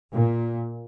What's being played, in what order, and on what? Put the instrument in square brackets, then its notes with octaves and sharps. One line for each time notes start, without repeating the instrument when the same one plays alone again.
[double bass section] A#2